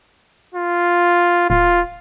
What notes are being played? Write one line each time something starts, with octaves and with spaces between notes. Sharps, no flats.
F4
D1 F4